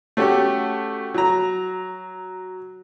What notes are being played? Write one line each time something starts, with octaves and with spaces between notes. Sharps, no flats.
A3 C#4 F#4 G4
F#3 A#5